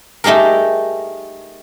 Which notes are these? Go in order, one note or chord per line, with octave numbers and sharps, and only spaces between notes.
A3 D#4 G4 G#4 A#4